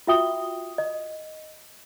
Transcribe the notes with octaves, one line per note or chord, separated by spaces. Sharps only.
F4 F#4 E5 G5 D#6 G7
D#5